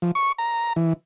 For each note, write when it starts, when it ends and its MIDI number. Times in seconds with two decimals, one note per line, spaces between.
0.02 0.11 53
0.15 0.32 85
0.38 0.73 82
0.76 0.93 52